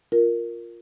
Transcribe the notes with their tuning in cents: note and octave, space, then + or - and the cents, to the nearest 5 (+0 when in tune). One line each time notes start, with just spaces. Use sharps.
F4 +0 A#4 +0